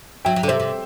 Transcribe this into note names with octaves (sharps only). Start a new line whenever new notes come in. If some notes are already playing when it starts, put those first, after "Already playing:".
F#3 E5 G5
F#3
D3
C3 C5 E5
C3